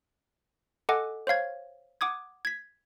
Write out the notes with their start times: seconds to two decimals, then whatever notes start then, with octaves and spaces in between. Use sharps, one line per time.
0.89 A4 D#5 F#5 G#5 D6
1.27 C5 C#5 F5 G#6
2.01 F#5 D6 D#6 G#6
2.45 G#6 B6